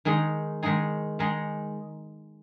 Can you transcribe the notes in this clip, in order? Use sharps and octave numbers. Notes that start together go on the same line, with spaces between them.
D#3 G#3 D#4 G#4
D#3 G#3 D#4 G#4
D#3 G#3 D#4 G#4